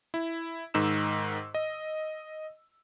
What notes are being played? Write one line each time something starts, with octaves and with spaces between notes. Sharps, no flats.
E4
G#2 D#3 E6 E7
D#5